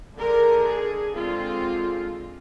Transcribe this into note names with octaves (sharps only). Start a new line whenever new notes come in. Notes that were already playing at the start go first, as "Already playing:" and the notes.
D3 G#3 D4 A#4
G#4
D3 G#3 C4 F4